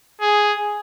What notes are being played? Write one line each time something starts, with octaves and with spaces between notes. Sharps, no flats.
G#4